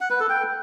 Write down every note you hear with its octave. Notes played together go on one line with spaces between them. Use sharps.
F#5
B4
A4
G5